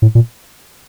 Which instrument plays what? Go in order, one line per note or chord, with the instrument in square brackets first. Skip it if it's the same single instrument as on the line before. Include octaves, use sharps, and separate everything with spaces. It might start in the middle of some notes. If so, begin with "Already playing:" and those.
[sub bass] A2
A#2